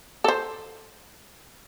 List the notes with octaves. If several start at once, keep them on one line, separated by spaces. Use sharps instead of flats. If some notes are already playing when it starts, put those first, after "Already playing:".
A4 C5